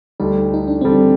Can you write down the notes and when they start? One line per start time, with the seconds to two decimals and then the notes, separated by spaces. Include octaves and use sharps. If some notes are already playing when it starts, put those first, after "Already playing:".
0.20 D2 D3 G3 D#4
0.54 D#4
0.68 D4
0.81 D2 D3 G3 C4